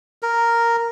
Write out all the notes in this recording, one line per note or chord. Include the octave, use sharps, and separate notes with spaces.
A#4